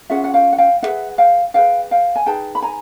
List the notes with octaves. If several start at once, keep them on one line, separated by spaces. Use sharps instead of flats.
C#4 F4 G#4 E5 F#5
F#5
F5 G5
F#5
F5 G5
E4 G#4 B4 E5 F#5
F5 G5
E4 G#4 B4 F5 G5
F5 G5
G#5
D#4 G#4 B4 G5 A5
B5
G#5 A#5